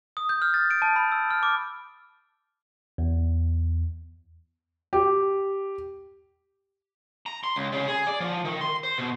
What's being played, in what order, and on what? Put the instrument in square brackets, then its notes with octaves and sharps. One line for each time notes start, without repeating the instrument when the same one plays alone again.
[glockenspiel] D#6
G6
F6
A6
D7
A5
B5
E6
F6
D6
[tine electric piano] E2
[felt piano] G4
[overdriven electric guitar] A#5
C6
C#2
C#3
G#4
D5
F3
D#3
C6
C5
B2